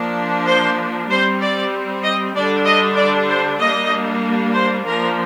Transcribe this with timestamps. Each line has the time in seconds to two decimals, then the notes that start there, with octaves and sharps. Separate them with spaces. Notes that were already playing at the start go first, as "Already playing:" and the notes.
Already playing: F3 A#3 D4
0.46 C5
1.09 G3 C4 C5
1.41 D5
2.03 D#5
2.35 D3 G3 D4 D5
2.66 D#5
2.97 D5
3.29 C5
3.60 G3 A#3 D4 D#5
4.54 C5
4.86 F3 A#3 D4 A#4